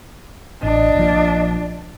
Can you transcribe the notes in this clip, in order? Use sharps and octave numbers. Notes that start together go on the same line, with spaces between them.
A1 D4 D#5
A#1 A#2 F3